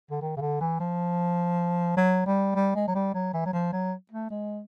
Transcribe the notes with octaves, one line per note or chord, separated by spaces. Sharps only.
D3
D#3
C#3
D3
E3
F3
F#3
G3
G3
G#3
F#3
G3
F#3
E3
F#3
F3
F#3
A3
G#3